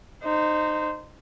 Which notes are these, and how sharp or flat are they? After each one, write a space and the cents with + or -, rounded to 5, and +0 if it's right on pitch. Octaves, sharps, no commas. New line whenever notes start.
D#4 -25 C5 -15